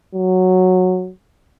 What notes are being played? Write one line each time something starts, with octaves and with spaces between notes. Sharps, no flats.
F#3